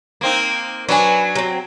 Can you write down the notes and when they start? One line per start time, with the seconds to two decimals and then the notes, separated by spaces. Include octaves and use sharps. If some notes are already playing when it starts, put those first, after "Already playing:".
0.21 A#3 C4 D#4
0.89 F#3 D4 B4 G#5
1.35 F#3 C4